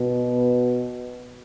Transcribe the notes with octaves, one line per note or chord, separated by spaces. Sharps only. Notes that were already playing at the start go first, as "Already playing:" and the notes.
Already playing: B2